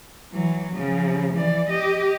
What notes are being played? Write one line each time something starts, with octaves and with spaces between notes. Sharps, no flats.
E3 F#3
C#3 F3
E3 D5
G4 D#5